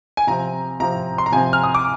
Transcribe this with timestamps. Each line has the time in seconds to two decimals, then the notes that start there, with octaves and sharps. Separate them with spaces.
0.17 G#5
0.27 C3 F3 C4 A#5
0.80 C3 F3 C4 A#5
1.18 C6
1.26 A#5
1.32 C3 F3 C4 G#5
1.53 F6
1.63 D#6
1.75 D6